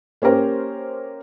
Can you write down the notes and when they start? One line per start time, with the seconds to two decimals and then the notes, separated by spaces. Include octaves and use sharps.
0.22 A#3 C#4 G4 A#4 C5